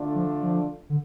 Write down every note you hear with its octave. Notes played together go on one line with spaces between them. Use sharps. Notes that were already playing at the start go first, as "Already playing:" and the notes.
Already playing: D3 A3 D4 F4
F3
F3
D3